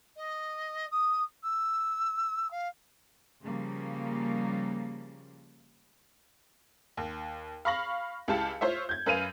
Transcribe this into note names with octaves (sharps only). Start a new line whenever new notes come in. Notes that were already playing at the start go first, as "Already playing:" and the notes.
D#5
D#6
E6
F5
C#3 F3 G3 A#3
D#2
F5 B5 C#6 A#6 F#7
C#2 E4 G4 F5 A5 C#7
F4 C5 C#5 E5
G6 G#6
F#2 B4 F5 D#7 F7